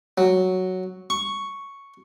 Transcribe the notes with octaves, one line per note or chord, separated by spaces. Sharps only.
F#3
C#6